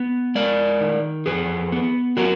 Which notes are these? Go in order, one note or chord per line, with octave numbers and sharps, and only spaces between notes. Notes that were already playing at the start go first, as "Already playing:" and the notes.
Already playing: B3
G#3 A#4 D5
D#3
F2 G#4 B4
B3
F#3 F#4 A#4